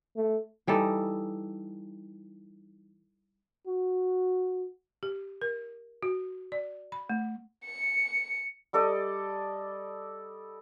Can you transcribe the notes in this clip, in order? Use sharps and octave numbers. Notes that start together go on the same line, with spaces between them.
A3
E3 G3 D#4 A4
F#4
G4
A#4
F#4
D5
B5
A3
C#7
G3 A4 D5 D#5